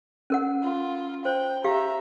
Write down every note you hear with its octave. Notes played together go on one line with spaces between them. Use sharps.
C#4 A#4 F#5
F4
C5 G5
G4 E5 F5 A#5